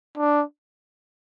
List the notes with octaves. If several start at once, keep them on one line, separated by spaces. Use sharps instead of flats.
D4